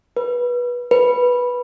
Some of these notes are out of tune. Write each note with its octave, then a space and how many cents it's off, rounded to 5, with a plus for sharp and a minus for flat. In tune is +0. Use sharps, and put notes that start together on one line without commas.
B4 -20
B4 -10